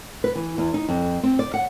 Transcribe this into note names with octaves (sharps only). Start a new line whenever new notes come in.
B4
E3
E2
D#4
F2
C4
D5
F#5